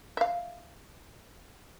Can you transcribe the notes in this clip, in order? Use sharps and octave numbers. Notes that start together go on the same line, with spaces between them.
E5 F5